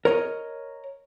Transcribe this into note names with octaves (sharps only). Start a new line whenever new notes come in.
A#4 C#5 D#5